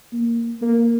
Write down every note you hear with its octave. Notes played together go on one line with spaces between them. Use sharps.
A#3
A#3